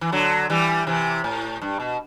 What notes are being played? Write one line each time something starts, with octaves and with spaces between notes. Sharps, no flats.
E3
D3 F#3
E3 G3
C3 E3
A2
G2
B2